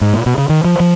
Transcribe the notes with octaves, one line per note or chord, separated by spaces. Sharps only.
G#2
A#2
B2
C#3
D#3
F3
F3